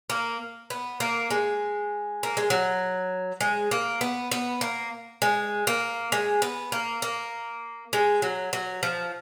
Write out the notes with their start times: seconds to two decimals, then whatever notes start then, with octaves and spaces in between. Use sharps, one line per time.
0.10 A#3
0.70 B3
1.00 A#3
1.30 G#3
2.23 A#3
2.37 G#3
2.50 F#3
3.41 G#3
3.71 A#3
4.01 B3
4.31 B3
4.61 A#3
5.22 G#3
5.67 A#3
6.12 G#3
6.42 B3
6.72 A#3
7.02 A#3
7.93 G#3
8.22 F#3
8.53 F#3
8.83 F3